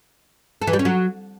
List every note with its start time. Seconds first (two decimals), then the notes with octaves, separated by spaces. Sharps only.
0.61 A4
0.67 E3
0.73 G3
0.79 C#4
0.85 F#3